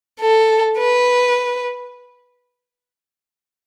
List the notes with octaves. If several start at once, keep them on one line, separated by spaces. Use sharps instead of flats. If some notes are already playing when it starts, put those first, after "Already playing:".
A4
B4